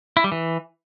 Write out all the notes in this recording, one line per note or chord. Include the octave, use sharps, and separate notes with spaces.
E4
G3
E3